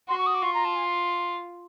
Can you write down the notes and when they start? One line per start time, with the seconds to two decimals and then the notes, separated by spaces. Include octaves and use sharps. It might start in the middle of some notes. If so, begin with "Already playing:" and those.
0.09 F#4 C6
0.18 C#6
0.27 D#6
0.35 D6
0.42 F4 C#6
0.54 A#5
0.65 A5
0.76 G#5